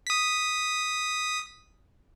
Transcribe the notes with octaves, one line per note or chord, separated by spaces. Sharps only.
D#6 B6